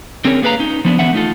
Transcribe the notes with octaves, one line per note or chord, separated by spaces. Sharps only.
D3 C4 C#4 G#4 A#4 C#5
A#3 G#4 A4 B4 F5 A#5
C#4 D#4
F3 B3 D4
D3 E3 B3 E5 F#5
A3 D#4 F4 A4